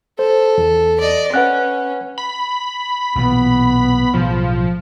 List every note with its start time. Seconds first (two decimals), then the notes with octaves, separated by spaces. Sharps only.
0.19 A4 C5
0.58 E2
1.00 D5 D#5
1.34 C#4 B4 F#5 F#6
2.18 B5
3.15 B1 A#2 E3 B3
4.14 B1 A2 C#3 F3